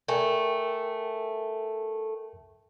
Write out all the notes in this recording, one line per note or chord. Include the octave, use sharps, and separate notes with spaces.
A3 A#4 G5 G#5